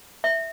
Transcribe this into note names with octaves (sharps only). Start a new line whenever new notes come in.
E5